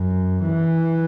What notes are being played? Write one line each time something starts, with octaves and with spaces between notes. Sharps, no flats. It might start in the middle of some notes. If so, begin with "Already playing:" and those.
Already playing: F#2
E3